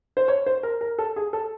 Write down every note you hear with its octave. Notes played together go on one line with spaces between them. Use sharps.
C5
C#5
C5
A#4
A#4
A4
G#4
A4